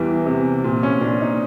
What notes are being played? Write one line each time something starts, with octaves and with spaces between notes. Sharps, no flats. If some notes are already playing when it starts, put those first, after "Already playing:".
Already playing: E2 E3 G3
C3
A#2
C#4
A#2 D4
D#4